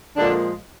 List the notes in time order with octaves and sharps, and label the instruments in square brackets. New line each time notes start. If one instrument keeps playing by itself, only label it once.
[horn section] A#2 D3 F3 G#3 D4